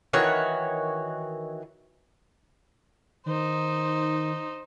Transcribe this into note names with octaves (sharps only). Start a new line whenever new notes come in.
D#3 E3 F#4 C#5
D#3 D#4 C5